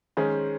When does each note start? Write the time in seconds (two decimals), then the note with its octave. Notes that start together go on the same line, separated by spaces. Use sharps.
0.17 D#3 G#3 C#4 G#4 C5